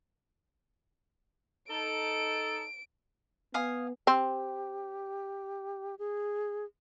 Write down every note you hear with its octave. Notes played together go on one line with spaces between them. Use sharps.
D#4 A4 D7
B3 F5 G#5 D#6
C4 G4
G#4